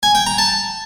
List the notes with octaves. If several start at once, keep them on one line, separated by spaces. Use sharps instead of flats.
G#5
G5
A#5
A5